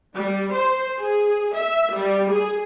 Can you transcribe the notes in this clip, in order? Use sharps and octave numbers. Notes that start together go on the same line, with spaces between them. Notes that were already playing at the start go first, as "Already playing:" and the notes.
G3
C5
G#4
E5
G3
G#4